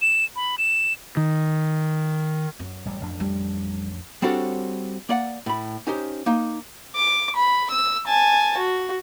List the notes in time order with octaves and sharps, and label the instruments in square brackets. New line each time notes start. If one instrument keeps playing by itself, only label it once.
[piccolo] E7
B5
E7
[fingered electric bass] D#3
[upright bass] F#2
[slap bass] A1 G3
A1 F2 D4
[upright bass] G3
[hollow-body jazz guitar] G3 C4 D4 F#4 A4 C#5
A#3 D5 F#5
A2 B5
C#4 D#4 G4 C5
A#3 D#4
[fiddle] D6
B5
E6
G#5 A5
F#4